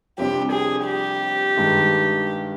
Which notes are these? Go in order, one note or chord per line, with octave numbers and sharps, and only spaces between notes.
F2 C3 G3 D4 G4
G#4
G4
G2 D#3 G#3